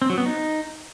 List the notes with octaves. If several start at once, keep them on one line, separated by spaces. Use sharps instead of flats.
C4
F#3
B3
D#4